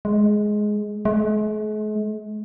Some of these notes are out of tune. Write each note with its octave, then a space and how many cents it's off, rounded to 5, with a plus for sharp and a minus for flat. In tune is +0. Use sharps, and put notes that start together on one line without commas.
G#3 +10
G#3 +45